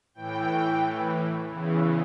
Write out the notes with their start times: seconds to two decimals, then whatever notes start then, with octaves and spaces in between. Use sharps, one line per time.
0.14 A2 E3 G5
1.47 E2 C#3 E3